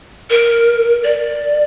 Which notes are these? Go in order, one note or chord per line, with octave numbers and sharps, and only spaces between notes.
A#4
D5